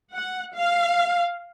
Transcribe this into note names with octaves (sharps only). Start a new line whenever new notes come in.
F#5
F5